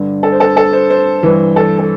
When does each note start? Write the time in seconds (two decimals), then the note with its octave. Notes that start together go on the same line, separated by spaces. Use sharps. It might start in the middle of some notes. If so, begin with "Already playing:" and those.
Already playing: G2 D3
0.23 A4
0.32 C5
0.40 A4
0.57 A4
0.73 C5
0.90 C5
1.23 G2 E3
1.56 A4
1.79 A4